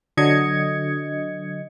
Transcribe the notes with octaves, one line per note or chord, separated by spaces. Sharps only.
D3 F#3 D#5 G#6 C#7